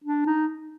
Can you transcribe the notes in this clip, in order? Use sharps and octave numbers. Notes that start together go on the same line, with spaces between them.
D4
D#4